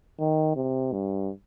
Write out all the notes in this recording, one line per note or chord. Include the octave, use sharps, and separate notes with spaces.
D#3
C3
G2